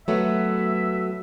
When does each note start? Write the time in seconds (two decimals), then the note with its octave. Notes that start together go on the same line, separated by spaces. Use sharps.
0.08 F#3 A3 B3 E5